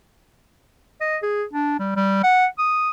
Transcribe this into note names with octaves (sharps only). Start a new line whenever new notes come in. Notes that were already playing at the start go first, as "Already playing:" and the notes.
D#5
G#4
D4
G3
G3
F#5
D#6